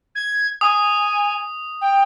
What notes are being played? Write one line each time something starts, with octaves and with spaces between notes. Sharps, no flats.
G#6
G#5 D#6
G5